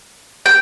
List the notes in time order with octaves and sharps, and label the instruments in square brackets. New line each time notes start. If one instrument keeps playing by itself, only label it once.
[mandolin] G5